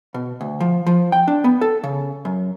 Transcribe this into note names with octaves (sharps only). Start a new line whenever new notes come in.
B2
D2
F3
F3
G5
D4
B3
A4
C#3
F#2